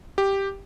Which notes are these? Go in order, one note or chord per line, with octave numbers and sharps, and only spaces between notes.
G4